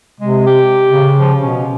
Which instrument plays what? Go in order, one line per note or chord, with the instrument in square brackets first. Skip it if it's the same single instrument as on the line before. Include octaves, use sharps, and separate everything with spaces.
[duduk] C3 [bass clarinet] G#3
[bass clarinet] G4
[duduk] C#3
[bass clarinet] F3
[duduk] B2 [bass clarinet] C#4